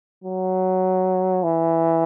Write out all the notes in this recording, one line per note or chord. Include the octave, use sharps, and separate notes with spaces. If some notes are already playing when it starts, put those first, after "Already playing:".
F#3
E3